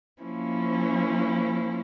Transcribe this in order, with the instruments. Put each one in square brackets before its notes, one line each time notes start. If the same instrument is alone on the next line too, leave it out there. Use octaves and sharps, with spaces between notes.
[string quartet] F3 A#3 C#4 E4